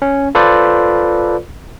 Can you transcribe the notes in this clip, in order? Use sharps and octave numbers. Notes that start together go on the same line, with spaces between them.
C#4
F4 A4 B4 C5 D5